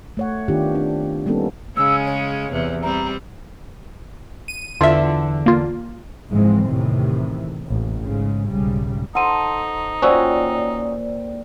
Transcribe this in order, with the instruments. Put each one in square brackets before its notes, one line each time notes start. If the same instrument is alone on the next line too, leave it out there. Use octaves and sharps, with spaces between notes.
[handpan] A3 C#5 F#5
D#3 B3 D4 F4 G4
C4 D4
G3 A#3 B3 C#4 D#4 A4
[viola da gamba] C#3 G#3 C#4 [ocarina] E6
[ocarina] C#5
[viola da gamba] E2 C3 E3
[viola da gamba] G3 C4 [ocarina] A#5
[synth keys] D#7
[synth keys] E2 D3 [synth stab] F4 E5
[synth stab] A#3 F4
[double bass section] F#1 G#2 E3 F3 G#3 C4
E2 A2 C3 D#3 E3
A1 D#2
G#2 C#3
B1 G#2 C#3 G3
[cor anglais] D#4 [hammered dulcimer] A4 C5 [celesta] F#5 C6 D#7
[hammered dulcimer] A#2 G5 [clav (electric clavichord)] C#4 F#4 [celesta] C5 D5 E6